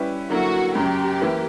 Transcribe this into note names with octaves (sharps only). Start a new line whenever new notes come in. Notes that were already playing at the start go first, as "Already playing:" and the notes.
Already playing: G3 C#4 E4 B4
D3 F#3 A#3 E4 F#4
F#2 C#3 F#3 G4
E3 A#3 E4 B4